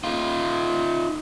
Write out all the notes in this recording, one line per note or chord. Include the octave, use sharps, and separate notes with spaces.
D#4 F4